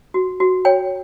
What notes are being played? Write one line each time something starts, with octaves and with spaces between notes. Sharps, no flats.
F#4
F#4
C#5 G5